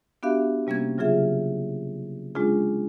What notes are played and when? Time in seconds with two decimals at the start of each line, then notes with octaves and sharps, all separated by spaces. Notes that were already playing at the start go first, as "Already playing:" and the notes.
0.23 B3 D4 F#4 G4 E5 F5
0.67 C3 G3 A#3 C#4 G#6
0.98 C#3 F#3 F4 G#4 E5
2.35 G#3 C#4 D4 F4 G#4